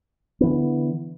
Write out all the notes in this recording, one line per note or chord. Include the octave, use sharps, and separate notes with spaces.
D3 E3 B3